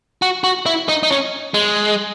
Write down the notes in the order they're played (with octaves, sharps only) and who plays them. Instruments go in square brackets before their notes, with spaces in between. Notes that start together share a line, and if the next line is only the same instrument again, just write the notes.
[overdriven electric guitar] F#4
F#4
E4
D#4
D#4
C#4
G#3